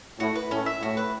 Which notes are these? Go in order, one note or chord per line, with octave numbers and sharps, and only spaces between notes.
A2 F#4
B4
A2 C#4
E5
A2 F#4
B4